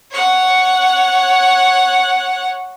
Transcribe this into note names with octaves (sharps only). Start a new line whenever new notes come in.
C#5 F#5